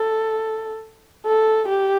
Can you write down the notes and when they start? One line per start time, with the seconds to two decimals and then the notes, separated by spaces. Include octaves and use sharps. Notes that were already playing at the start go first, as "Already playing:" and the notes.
Already playing: A4
1.26 A4
1.69 G4